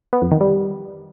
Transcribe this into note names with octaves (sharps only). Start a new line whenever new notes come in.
B3
F2
D#3
G3